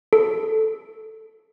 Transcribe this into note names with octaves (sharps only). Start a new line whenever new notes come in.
A4